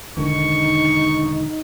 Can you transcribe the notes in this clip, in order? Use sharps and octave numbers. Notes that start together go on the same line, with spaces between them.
E1 D3 D#3 D#4 C#6